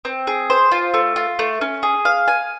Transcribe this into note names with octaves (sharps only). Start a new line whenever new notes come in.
C4
G#4
C5
F4
A3
F4
A3
C#4
G#4
F5
G#5